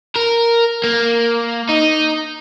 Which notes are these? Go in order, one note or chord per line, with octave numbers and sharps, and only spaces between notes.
A#4
A#3
D#4